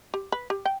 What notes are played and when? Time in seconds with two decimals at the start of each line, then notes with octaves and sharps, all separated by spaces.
0.14 G4
0.32 B4
0.50 G4
0.65 G5